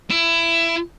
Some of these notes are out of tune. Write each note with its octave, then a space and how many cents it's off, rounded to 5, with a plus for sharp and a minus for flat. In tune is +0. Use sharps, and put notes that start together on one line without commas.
E4 +20